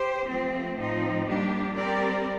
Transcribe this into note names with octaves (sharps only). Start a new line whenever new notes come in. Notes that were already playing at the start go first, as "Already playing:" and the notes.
Already playing: G4 C5
F3 A3 C4
A2 F3 C4 D#4
G3 A#3 D4 G4
G3 C4 G4 A#4 D5